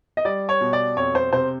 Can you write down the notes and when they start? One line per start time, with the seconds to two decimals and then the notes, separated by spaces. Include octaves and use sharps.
0.17 D#5
0.25 G3 D5
0.49 C#5
0.61 B2
0.73 D5
0.96 F2 C#5
1.15 C5
1.33 C3 C5